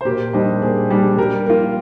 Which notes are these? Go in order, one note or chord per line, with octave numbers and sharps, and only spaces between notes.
C5
A#2 G4 A#4
G3 D4 C5 D#5
A#2 G#4 C5
G3 D4
G3 G4 A#4
A#3 F4